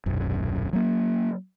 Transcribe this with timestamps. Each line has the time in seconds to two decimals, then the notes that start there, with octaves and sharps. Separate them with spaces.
0.06 D#1 B1 F#2
0.73 F#3 A#3